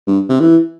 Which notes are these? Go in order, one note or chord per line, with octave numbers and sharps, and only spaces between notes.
G2
C3
E3